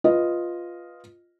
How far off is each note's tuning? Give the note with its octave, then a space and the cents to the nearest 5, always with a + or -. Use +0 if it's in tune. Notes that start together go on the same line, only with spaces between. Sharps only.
F4 +0 B4 -5 D#5 +0